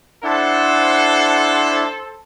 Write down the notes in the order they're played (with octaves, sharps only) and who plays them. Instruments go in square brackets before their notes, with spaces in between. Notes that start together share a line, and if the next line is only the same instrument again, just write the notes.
[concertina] D4 E4 [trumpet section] A4 C5 [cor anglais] F#5